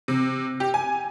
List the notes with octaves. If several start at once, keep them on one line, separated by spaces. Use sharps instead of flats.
C3
G4
G#5